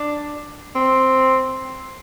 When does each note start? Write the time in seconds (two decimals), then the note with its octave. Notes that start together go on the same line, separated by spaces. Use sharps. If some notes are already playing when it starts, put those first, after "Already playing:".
Already playing: D4
0.75 C4